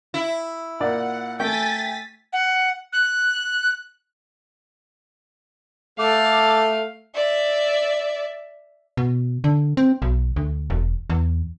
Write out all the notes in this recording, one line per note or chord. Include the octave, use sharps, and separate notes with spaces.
E4
A#2 D5 F#5
A3 G5 G#5 A6 B6
F#5
F#6
A3 A4 F5 D6
D5 E5
B2
D3
C4
B1
D2
E1
E2